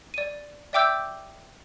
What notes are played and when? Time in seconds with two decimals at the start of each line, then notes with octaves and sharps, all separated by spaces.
0.14 D5 D#7
0.73 D5 E5 G5 D6 E6 G6